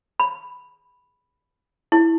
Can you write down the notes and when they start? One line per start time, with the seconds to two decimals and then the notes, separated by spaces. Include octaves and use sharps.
0.20 B5
1.92 E4